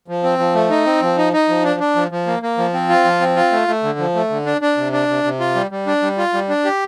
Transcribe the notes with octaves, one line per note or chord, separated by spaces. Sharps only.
F3
C4
F3
A3
D#4
C4
F3
D#4
D#4
F3
D4
D4
F3
F3
A#3
A#3
F3
C4
F4
F3
C4
F4
A3
A3
D3
F3
A3
D3
D4
D4
C3
D4
C3
C3
F4
G3
G3
D4
G3
F4
G3
D4
G4